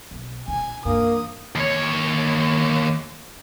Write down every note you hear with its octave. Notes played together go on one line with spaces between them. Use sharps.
B1
A#1 G#5
G2 E3 A#3 D#6
D#2 C#5